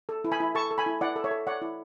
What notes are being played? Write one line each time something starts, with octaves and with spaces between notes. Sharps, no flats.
A4
E4
G#5 B5
E4
A4 A5 C#6
A4
G#5 B5
E4
E4 D5 F#5
A4
C#5 E5
A4
C#5 D5 F#5
E4